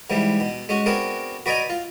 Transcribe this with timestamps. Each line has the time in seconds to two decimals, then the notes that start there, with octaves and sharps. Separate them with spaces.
0.10 G#2 E3 G3
0.40 B2
0.69 G#3 C#4 F#4
0.86 B3 C4 D4 F#4 G#4 A#4
1.46 F#4 B4 D5 D#5 G#5 A#5
1.70 F4